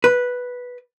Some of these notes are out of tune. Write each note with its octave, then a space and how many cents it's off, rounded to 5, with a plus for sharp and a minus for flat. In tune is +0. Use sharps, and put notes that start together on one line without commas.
B4 -5